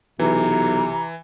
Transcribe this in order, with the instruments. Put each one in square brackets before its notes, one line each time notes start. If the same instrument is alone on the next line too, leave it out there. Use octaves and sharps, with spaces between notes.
[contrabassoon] B1 [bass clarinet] C3 [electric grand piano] E3 [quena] A#5